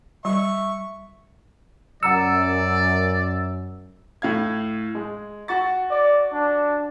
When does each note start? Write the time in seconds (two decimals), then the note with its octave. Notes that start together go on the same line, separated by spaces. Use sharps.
0.25 G3 E5 C#6
2.03 F#2 D5 F#5 A#5 E6 C#7
4.22 A2 F5 G#6
4.95 G#3
5.48 F#4 C#6 A6
5.90 D5
6.33 D4